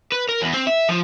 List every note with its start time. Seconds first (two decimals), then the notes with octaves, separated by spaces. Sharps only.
0.12 B4
0.29 A#4
0.42 E2
0.54 C4
0.67 E5
0.89 F3